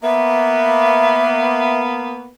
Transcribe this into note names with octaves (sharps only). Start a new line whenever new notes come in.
A#3 B3 E5